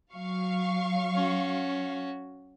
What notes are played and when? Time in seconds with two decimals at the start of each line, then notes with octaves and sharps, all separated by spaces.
0.13 F#3 F5 C#6
1.15 C#4 F#4